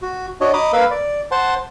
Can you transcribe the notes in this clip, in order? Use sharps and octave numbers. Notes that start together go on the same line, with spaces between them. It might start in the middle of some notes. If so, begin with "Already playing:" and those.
F#4
D4 F#4 C#5 D#5
D#5 A#5 B5 D6 D#6
A#3 A#4 B4 F5 B5 E6
D5
C5 F#5 A5 C6